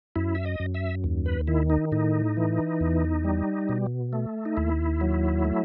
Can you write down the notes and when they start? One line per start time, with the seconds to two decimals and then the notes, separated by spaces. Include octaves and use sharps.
0.16 F#2 E4
0.35 E5
0.45 D#5
0.60 F#2
0.74 E5
1.04 D#2
1.26 B4
1.47 D#3 E4
1.70 D#4
1.92 A2 D#4
2.37 E3
2.80 E2
3.24 G3
3.69 B2
4.13 A3
4.45 D#4
4.57 D#2 E4
5.01 F#3
5.45 A3